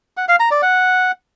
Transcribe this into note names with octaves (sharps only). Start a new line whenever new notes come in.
F#5
F5
A#5
D5
F#5